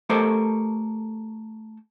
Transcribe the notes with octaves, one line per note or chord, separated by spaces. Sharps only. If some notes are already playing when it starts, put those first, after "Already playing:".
A3 G4 A4 A#4 C5 D#5